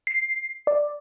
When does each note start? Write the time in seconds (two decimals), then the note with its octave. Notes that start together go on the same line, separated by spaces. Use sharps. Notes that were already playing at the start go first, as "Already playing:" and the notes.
0.07 C7
0.67 D5